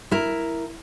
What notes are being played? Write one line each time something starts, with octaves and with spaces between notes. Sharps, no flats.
E4 A#4